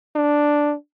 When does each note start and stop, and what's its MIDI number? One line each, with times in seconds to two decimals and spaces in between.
0.16 0.75 62